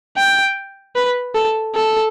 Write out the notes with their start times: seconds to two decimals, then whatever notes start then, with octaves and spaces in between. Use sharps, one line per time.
0.17 G5
0.96 B4
1.35 A4
1.75 A4